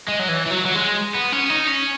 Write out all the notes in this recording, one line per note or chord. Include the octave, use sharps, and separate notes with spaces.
G#3
F#3
E3
E3
F#3
F#3
G#3
B3
C#4
D#4
C#4